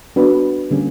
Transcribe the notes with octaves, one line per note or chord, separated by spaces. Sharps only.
B3 D4 F#4 B4
D3 G3 A#3 C#4 G4